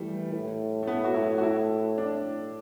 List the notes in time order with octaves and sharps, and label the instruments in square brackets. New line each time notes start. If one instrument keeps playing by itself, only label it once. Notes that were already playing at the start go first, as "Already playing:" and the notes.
Already playing: [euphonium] E3 [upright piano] G3 A3
[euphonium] A2
[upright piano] A3
B3
F#4
E4
F#4
E4
D4